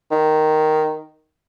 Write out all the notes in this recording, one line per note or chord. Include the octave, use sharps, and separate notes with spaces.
D#3